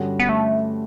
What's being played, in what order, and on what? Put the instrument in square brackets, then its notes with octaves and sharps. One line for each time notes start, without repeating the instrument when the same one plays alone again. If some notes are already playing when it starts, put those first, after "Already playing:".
Already playing: [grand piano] G2 D3 G3 C#4 F#4
[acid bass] B3
A3